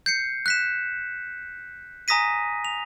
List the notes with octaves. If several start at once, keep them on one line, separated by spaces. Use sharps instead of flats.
G6 C7 C#7
F#6 B6 E7
G#5 A#5 D#6 A#6 B6 D#7
F7